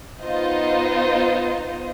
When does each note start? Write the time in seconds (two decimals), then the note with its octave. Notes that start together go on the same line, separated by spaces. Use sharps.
0.25 B3 D#4 F4 C5 D#5